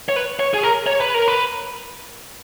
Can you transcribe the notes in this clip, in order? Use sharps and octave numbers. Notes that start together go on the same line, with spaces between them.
C#5
B4
C#5
G#4
A#4
C#5
B4
A#4
B4